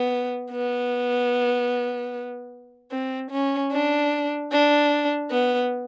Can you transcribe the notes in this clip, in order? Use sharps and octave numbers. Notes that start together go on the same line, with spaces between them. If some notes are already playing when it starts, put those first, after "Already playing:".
Already playing: B3
B3
C4
C#4
D4
D4
B3